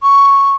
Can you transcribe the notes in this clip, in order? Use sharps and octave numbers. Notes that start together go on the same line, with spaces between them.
C#6